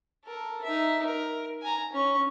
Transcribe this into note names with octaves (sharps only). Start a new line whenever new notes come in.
A4 A#4
D#4 E5
A#4
G#5 A#5
C#4 C#6